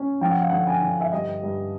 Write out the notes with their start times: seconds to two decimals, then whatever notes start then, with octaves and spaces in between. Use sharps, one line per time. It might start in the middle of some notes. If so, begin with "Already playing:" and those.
Already playing: C#4
0.21 F3 G5
0.30 F#5
0.40 F5
0.50 D3 F#5
0.67 G#5
0.82 D3
1.01 E5
1.12 G2 D#5
1.42 G2